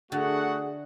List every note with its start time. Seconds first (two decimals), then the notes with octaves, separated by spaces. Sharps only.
0.12 D3 A3 F#4 G#4 F#5